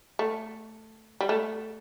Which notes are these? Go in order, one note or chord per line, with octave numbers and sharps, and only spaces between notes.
A3
G3
A3